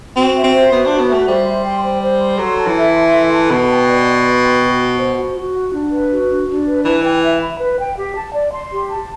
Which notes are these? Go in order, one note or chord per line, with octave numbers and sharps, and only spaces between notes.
C4 F#4
E5
C4
C5
B3 F#4
D4 F#4
B3
A3 E5
G3 C5
C6
G5
C5
C5
C6
F#3 A4
A5
E3
E5
C6
A4
A5
B2 B4
G5
D5
C6
B4
G5
F#4
F#5
C5
F#4
F#4
F#5
D4
B4
F#4
D4
D4
B4
E3 B4
G5
E5
B5
B4
G5
G4
A5
D5
C6
G4
A5